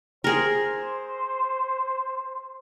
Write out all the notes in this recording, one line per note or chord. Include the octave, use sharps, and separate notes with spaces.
G#4 A#4 C5